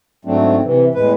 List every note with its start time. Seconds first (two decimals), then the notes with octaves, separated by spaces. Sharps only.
0.25 G#2 F#3 A3 C4 D4
0.63 C3 E3
0.95 E2 A2 G#3 B4